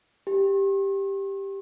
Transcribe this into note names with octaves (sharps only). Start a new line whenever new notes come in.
G4